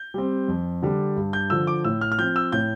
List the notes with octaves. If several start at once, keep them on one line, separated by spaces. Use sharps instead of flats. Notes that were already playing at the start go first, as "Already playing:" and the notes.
Already playing: G6
G3 C4
F2
D3 G3 D4
G2
G6
D3 F3 E6
D6
A2 E6
F6
F6
F3 C4 G6
E6
A2 G6